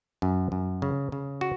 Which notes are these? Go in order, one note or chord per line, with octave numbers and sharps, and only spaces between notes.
F#2
F#2
C#3
C#3
F#4